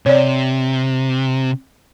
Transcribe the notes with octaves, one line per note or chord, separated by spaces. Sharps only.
C3 C#5 D5